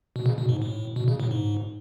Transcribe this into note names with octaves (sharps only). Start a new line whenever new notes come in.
B2
C#3
B2
G#2
A2
B2
C#3
A2
G#2